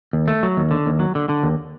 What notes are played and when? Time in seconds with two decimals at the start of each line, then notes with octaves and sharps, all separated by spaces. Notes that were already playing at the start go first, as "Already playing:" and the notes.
0.13 D#2
0.28 A3
0.43 F#3
0.57 D#2
0.71 D3
0.86 D#2
1.00 F#3
1.15 D3
1.29 D3
1.43 D#2